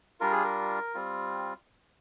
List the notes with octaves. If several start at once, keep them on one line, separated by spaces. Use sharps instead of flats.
G3 D4 F4 A#4
G#4
A#4
G3 C4 F4